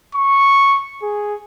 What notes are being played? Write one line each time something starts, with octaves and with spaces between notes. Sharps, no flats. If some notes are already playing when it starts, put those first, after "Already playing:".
C#6
G#4